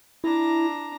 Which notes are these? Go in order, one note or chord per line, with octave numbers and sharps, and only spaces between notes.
D4 E4 A#5